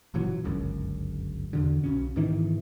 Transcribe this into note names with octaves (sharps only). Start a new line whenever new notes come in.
F#1 A#2 E3 F#3
G1 C#2 F#2
E2 B2 D3
B1 B2 C#4
G#2 B2 D#3 E3